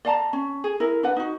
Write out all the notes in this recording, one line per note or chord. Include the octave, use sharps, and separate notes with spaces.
D5 F5 A5 A#5
C#4
G#4
E4 A#4
D4 B4 F#5
D#4 F#4